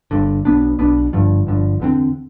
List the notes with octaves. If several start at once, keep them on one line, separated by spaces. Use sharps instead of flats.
G1 G2 D3
B1 B2 B3 D4
B1 B2 B3 D4
G1 G2 D3 F3
G1 G2 D3 F3
E2 D3 A3 C4